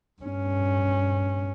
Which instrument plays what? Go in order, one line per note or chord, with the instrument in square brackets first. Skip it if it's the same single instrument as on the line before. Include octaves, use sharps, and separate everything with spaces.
[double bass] G2 C#4